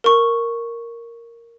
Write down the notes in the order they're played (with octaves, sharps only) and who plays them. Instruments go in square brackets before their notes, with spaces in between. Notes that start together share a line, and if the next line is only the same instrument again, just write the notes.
[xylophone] A#4 C#6